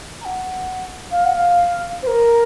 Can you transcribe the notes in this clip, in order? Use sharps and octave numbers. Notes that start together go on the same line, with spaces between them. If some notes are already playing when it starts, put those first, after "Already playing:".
A#5
F#5
F5
F#5
F5
C5
A#4